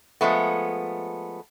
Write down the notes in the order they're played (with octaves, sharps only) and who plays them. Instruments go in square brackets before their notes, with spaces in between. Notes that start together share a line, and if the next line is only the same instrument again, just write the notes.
[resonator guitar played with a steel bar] F3 G#3 A3 B3